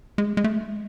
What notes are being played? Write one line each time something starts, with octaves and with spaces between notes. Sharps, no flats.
G#3
G#3
A3
G#3